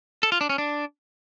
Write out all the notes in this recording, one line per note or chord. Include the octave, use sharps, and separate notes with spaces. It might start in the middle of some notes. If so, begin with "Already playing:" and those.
A4
F4
D4
C#4
D4